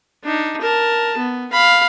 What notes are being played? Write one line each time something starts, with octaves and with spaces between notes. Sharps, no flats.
D4 D#4
A#4 A5
B3
F5 B5